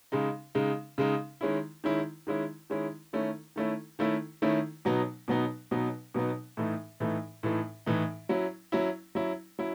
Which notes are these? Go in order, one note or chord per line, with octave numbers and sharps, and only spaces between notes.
C#3 G#3 D#4
C#3 G#3 D#4
C#3 G#3 D#4
D#3 G#3 C#4 E4
D#3 G#3 C#4 E4
D#3 G#3 C#4 E4
D#3 G#3 C#4 E4
D#3 A3 C#4 E4
D#3 A3 C#4 E4
D#3 A3 C#4 E4
D#3 A3 C#4 E4
B2 F#3 B3 D#4
B2 F#3 B3 D#4
B2 F#3 B3 D#4
B2 F#3 B3 D#4
A2 E3 A3 D#4
A2 E3 A3 D#4
A2 E3 A3 D#4
A2 E3 A3 D#4
F#3 C#4 E4
F#3 C#4 E4
F#3 C#4 E4
F#3 C#4 E4